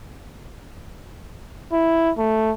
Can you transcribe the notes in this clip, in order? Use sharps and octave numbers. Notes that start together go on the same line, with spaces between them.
E4
A3